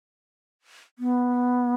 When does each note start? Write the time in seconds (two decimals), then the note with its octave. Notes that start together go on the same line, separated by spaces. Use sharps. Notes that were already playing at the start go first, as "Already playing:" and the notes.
0.99 B3